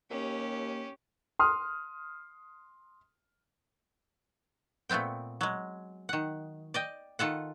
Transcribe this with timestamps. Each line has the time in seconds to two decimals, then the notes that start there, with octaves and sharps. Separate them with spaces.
0.10 D#2 A#3 C#4 G4
1.39 C6 D#6 F6
4.89 A#2 A3 B3 C4 G5
5.41 F#3 G#3
6.09 D#3 F#5
6.74 D5 D#5 G5
7.19 D#3 F4 A4 F#5